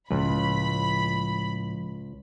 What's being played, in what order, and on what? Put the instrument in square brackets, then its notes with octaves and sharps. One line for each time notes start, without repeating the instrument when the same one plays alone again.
[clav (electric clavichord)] C#2 [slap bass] A2 F3 [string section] B5